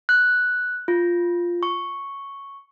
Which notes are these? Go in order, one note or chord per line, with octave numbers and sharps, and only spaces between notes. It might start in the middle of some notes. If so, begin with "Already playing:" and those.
F#6
F4
C#6